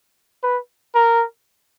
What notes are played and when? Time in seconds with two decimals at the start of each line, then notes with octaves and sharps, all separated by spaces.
0.43 B4
0.95 A#4